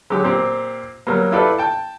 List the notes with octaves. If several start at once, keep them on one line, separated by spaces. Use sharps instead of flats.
F#3 G#3 G4
A#2 C4 G4
F#3 G3 A#3
E4 F4 G4 A4 B4 D5
G5 A5